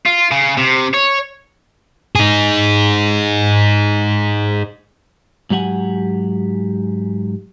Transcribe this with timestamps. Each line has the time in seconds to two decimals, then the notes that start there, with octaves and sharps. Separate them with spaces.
0.06 F4
0.31 C#3
0.57 C3
0.94 C#5
2.15 D#4 G#4
5.50 G#2 F#3 G4 F#5 G#5